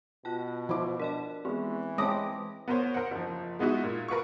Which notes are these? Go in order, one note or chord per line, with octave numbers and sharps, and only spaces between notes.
B2 F4 A5
F3 E4 C5 D6
D4 A#4 D#5 A5
E3 G#3 B3 C4
G#3 C4 C#5 A5 D6 D#6 A#6
B3 A#4 C5 C#5
A#4 C5 F#5
F#1 F3
G#3 B3 D#4 E4 F#4
A#2
A#4 B4 F5 C#6